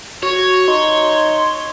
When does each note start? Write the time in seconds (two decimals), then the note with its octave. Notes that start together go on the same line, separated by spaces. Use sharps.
0.23 F#4 C#5
0.68 D#4 C6